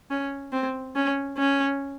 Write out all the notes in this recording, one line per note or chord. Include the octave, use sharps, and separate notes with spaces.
C#4
C4
C#4
C#4